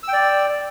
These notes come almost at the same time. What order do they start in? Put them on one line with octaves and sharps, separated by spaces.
E6 G5 D5